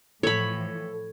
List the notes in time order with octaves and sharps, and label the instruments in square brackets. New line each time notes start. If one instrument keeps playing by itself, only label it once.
[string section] A2 E3 F3 [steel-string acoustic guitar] A4 [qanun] C#5 B5